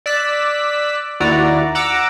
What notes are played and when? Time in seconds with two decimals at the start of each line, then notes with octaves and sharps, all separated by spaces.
0.06 D5 E6 F#6 B6
1.20 D#2 E4 F#4 D5 A#5
1.75 F#5 A#5 D6 E6